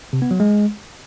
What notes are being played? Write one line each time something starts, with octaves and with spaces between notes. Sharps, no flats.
C3
B3
F#3
G#3